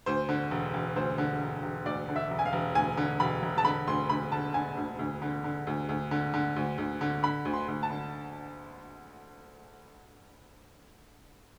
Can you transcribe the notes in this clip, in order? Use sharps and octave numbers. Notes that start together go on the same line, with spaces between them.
D2 C5
D3
E1
E1
D2 C5
D3
E1
E1
D2 D5
D3
E5
E1
G#5
F5
E1
D2 G#5
D3
E1 B5
E1
A5
D3 B5
D2 C6
D2 B5
D3 A5
D3 G#5
D2
D2
D3
D3
D2
D2
D3
D3
D2
D2
D3
D3 B5
D2
C6
D2
A5
D3